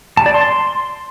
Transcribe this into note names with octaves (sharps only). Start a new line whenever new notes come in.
A5
D5
C6